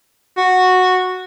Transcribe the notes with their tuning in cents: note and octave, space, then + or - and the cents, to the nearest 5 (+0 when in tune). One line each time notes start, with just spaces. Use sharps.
F#4 -10